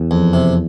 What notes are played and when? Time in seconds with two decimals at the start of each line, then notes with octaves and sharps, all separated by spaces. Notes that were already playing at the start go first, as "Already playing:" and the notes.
Already playing: E2
0.11 F2
0.33 C3